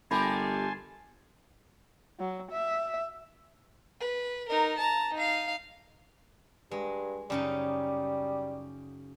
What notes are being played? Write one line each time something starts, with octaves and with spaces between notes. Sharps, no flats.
G1 A3 G4 A#4 G#5 A5 B5 C6
F#3
E5
B4
D#4 A#4
A5 A#5
D#4 F5
G2 G#3
F#2 C#3 G3 D#4